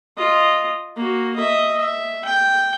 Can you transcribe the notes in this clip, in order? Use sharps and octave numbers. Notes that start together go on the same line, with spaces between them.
F4 D#5
A#3 F#4
D#5 E5
E5
G5